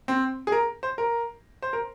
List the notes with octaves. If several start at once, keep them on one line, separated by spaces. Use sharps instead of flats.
C4
G#4
A#4
C5
A#4
C5
A#4